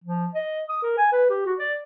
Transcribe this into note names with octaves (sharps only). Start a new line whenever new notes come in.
F3
D#5
D#6
A#4
G#5
B4
G4
F#4
D5